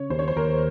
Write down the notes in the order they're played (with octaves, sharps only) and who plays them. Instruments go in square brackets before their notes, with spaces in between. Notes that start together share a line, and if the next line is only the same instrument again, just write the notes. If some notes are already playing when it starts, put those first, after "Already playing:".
Already playing: [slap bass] C#3 [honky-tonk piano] C#5
[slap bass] D#2 [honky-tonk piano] C5
[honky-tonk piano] C#5
C5
[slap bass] D#2 [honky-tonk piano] A#4